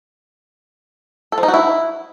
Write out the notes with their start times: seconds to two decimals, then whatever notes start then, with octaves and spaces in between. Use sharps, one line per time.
1.32 A4
1.38 F3
1.43 D#4
1.48 F#4
1.54 E4